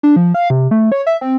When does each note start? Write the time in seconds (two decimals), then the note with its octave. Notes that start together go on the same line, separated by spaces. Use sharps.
0.03 D4
0.16 F3
0.34 F5
0.50 C3
0.71 A3
0.92 C#5
1.07 E5
1.21 C4